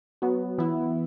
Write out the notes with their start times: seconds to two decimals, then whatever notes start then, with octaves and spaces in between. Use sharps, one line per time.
0.22 F#3 B3 F#4
0.58 E3 B3 E4